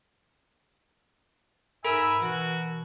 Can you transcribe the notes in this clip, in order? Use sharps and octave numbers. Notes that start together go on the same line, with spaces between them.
G#2 A#4 E5 G#5 B5
B2 E3 F#4